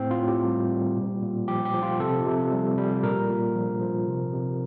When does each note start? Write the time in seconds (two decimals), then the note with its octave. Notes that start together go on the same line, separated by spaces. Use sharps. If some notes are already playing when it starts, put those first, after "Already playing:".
Already playing: A2 C4
0.11 F4
0.19 A2
0.28 G4
0.45 G3
0.71 G3
0.97 A#2
1.23 A#2
1.48 F3 G4
1.65 G4
1.74 F3
1.83 F4
2.00 C3 A4
2.26 C3
2.52 G3
2.78 G3
3.03 A#2 A#4
3.29 A#2
3.55 F3
3.81 F3
4.07 C3
4.33 C3